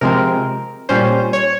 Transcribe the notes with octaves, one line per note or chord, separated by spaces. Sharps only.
C3 F3 G#3 C4 A#4
A#2 G3 C#4 C5
C#5